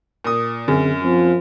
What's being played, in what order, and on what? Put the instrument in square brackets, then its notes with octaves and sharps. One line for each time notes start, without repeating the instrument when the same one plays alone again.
[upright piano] A#2 D#6
[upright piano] F#2 [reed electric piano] D3 C4 G#4
[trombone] F3 [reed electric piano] C4